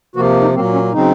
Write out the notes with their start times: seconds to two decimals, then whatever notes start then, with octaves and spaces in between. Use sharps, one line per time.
0.16 C3 F3 A#3 F#4
0.41 D#4
0.54 A#2 F#3 A#3 C4
0.73 C#4
0.92 C#3 F#3 C4 D#4